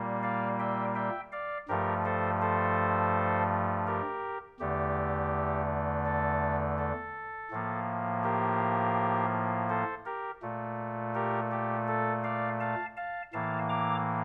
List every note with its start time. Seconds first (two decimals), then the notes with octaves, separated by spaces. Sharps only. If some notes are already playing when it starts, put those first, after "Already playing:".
Already playing: A#2 G3 A#3
0.23 D5 F5
0.59 E5 G5
0.95 E5 G5
1.32 D5 F5
1.68 G2 F3 A3 G4 A#4
2.05 A4 C5
2.41 A4 C5
3.87 G4 A#4
4.60 E2 D3 A3 G4
6.05 A4
6.78 A4
7.51 A2 F3 A#3
8.23 G4 A#4
9.69 A4 C5
10.06 G4 A#4
10.42 A#2 A3
11.15 G4 A#4
11.52 G4
11.88 A4
12.24 D5 F5
12.60 F5 A5
12.97 F5 A5
13.33 A2 E3 A#3 F5 A5
13.69 A#5 D6